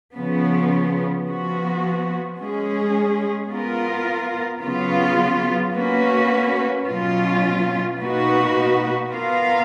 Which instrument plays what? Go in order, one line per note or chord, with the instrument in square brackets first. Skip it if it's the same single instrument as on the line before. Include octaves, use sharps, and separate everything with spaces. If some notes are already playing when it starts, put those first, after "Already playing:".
[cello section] C#3 F3 B3
F3 B3 F#4
G#3 C#4 G#4
B3 F4 A#4
C#3 F#3 B3 F4
A#3 C#4 F#4 B4
B2 F#3 C#4 F4
B2 A#3 D#4 F#4 B4
B3 F4 A#4 F5